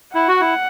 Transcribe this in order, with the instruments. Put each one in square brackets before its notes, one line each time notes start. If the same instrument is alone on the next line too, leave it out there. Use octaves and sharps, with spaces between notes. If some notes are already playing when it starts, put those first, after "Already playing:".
[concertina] E4 [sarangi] F#5
[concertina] F#4
E4